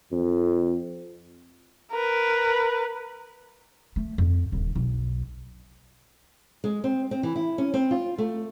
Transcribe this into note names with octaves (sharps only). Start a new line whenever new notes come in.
F2
A#4 B4
A3
F2
D#1 D3
B1
G#3
C4
C4
E3
E4
C#4
C4
F4
A3